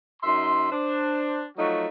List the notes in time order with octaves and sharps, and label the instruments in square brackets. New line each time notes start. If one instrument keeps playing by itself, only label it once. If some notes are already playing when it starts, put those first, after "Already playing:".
[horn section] F#2 D#4 E5 C6
D4 C5
F3 F#3 A3 D#4 F#4